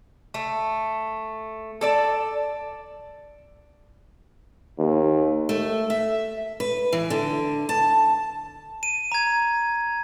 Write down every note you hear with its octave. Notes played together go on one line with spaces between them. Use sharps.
A3
A4 D5 A5
D#2
A3
E5
B4
E3
D3
A5
D#7
A#5 G#6